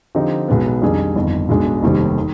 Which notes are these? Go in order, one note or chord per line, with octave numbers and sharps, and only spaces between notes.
D3 F3 C4 D#4 G4
B1 B2 G#3 B3
F2 D#3 G3 D4 G#4
G1 F2 D#3
B1 B2 G#3 D4
F1 D#2 D#3 G3 C4
D#3